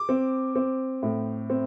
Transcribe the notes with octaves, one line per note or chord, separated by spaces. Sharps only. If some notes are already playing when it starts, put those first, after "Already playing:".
Already playing: D6
C4
C4
A2
C4